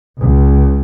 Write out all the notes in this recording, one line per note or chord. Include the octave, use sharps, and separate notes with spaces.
C#2